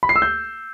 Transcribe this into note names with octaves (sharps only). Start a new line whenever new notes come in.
B5
C7
E6
G6